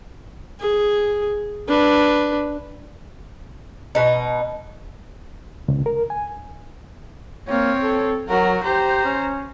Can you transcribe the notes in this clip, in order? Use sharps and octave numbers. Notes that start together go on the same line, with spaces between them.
G#4
D4 B4
B2 D#4
C#2
A#4
G#5
A#3 C4 C#5
A4
F#3 F#4 A#4
G4 C5 A#5
C#4